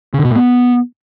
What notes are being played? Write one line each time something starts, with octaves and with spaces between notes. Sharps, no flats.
C#3
D3
B2
A2
B3